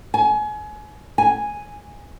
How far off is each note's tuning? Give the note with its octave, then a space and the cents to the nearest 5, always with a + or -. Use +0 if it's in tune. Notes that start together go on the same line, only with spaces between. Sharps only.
G#5 +30
G#5 +0